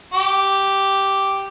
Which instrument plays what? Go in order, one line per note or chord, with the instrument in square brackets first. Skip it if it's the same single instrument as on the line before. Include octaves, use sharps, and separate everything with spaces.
[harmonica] G4